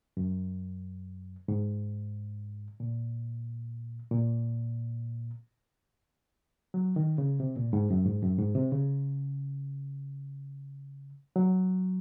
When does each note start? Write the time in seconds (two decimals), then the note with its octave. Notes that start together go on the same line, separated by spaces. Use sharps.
0.17 F#2
1.48 G#2
2.80 A#2
4.11 A#2
6.74 F#3
6.96 D#3
7.18 C#3
7.40 C3
7.56 A#2
7.73 G#2
7.90 F#2
8.06 G#2
8.23 F#2
8.39 G#2
8.55 C3
8.72 C#3
11.36 F#3